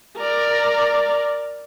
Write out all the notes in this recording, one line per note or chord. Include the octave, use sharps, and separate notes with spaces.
A#4 D5